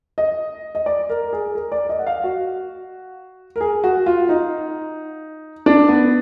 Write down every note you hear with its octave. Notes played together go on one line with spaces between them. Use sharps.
D#5
D#5
D5
A#4
G#4
A#4
D5
D#5
F#5
F5
F#4
A#4
G#4
F#4
F4
D#4
D4
B3